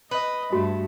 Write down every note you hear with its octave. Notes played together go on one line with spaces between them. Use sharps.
B4 D#5
G2 A3 F#4